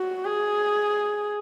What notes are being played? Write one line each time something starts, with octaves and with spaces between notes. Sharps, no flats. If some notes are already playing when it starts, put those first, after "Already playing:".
Already playing: F#4
G#4